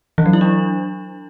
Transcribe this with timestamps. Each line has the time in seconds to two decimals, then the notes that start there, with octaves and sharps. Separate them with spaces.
0.18 E3
0.26 F#3
0.33 E4
0.41 D4